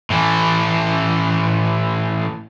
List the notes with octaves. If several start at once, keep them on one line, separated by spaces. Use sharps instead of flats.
A2 E3